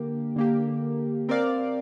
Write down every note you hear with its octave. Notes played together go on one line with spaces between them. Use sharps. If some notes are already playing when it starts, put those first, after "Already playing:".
Already playing: D3 A#3 G4
D3 A#3 G4
C4 A#4 D5 F5